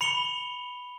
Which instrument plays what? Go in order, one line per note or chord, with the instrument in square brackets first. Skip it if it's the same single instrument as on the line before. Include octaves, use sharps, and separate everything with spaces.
[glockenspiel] B5 C#7 F7 G7